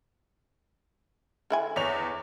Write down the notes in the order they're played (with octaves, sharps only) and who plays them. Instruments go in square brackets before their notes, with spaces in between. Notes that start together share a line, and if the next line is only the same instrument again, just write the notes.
[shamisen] D3 E4 G#5
[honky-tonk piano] E2 C#5 F7